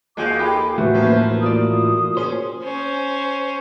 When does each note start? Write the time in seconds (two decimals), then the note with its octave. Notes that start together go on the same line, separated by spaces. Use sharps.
0.17 D#2 G#3 F4 F#4 F5 G#5 D6 G6
0.39 F4 G4 A4 B5
0.78 A2 E3 A3 F#4 B4 C5 E5
0.94 F3 A#3 C#4
1.42 A#3 F4 D5 D#6
2.17 C#4 G#4 C5
2.63 C#4 C5